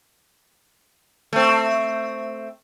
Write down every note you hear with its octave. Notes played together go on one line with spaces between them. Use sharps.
A3 C4